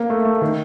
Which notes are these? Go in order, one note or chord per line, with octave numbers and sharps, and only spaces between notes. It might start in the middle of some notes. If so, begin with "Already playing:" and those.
Already playing: A#3
A3
A3
D#3